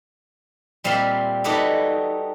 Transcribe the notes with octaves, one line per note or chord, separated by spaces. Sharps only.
A#2 G3 C4 E5 F5 B5
G3 D#4 F#4 A4 B4 D5